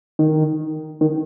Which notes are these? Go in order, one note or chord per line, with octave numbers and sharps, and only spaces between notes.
D#3
D#3